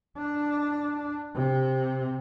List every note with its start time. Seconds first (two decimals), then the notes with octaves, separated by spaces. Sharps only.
0.18 D4
1.36 C3